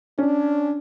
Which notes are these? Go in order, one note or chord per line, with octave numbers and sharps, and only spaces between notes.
C#4 D4